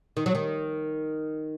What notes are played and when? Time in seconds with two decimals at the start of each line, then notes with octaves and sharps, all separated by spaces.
0.17 D#3
0.26 F#3
0.35 D#3